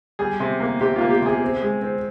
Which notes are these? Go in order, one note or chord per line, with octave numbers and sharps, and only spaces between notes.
G3 G#4
C3
A#3
C3 G4
A#3 F4
G4
C3 G#4
C4
G#3
C4